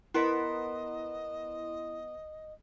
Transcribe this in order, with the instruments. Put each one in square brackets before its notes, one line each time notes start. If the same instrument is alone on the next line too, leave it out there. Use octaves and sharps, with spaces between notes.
[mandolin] B3 A#4 B5 [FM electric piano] E4 [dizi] D#5 [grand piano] C6